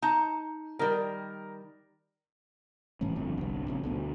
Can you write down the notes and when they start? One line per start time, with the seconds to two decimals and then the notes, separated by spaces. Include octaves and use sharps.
0.02 D#4 A5 A#5
0.79 D#3 G3 A#4
3.01 A2 E3 A3 C#4
3.16 G1 F2 D3
3.37 G1 C2 G2
3.67 A#1 A#2 C#3
3.83 D2 B2 D3